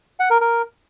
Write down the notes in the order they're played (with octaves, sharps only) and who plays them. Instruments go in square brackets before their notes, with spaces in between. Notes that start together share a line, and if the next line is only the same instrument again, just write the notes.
[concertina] F#5
A#4
A#4